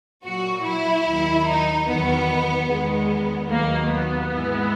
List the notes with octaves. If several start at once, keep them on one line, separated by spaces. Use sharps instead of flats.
A#2 F#3 F#4
E4
D#2 D#3 F#3
D#4
E2 D#3 F#3 B3
E2 D#3 G#3 B3
D#2 D#3 F#3 A#3
B3
G#2 E3 G#3